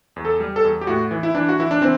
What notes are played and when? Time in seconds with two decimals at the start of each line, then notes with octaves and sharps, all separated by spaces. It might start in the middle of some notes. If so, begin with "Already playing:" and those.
0.16 E2
0.25 A4
0.40 G3
0.56 A4
0.64 E2
0.81 G4
0.87 A2 F#4
1.11 E3
1.23 E4
1.34 E3 D4
1.49 F#4
1.59 E3 E4
1.71 D4
1.82 E3 C4